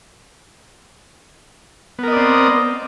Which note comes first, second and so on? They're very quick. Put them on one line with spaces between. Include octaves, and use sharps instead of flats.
B3 A#4 D#5 D5 C4